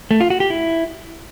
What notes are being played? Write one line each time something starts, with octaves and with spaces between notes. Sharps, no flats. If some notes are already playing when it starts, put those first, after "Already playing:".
A3
F4
F#4
G4
E4